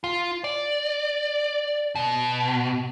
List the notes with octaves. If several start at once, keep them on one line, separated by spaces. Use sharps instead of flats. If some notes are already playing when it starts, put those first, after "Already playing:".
F4
D5
B2